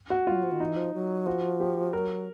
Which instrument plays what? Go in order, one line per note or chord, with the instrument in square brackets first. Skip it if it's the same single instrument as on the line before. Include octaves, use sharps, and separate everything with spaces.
[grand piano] F#4
[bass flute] G3 [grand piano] F4
[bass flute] F#3
F3
D#3
[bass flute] E3 [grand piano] D#4
[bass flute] F3
F#3
[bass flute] F3 [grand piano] F#4
[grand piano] G4
[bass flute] F#3 [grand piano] A#4